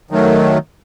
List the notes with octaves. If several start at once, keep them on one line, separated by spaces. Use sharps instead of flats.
D#3 F#3 A3